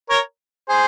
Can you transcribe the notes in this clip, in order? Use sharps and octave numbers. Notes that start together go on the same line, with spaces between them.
A#4 C#5
G#4 C5